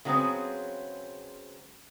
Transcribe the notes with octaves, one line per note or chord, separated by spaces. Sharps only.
C#3 F#3 G#3 B3 C4